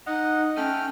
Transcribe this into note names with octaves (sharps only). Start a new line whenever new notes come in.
D#4 D#5 F#5
A3 C#4 G5 F6